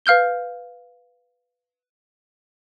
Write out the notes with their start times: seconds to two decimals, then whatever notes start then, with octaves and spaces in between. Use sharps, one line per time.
0.06 B4 F5 F6 G6 G7